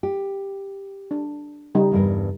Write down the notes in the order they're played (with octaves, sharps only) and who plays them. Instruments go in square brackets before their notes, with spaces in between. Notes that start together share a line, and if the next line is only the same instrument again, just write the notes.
[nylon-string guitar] G4
[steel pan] D4
C#3 G3 D#4
[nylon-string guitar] E2 G2 A#4